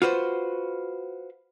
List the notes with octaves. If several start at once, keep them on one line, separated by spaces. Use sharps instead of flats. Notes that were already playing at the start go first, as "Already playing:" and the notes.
F4 F#4 B4 C5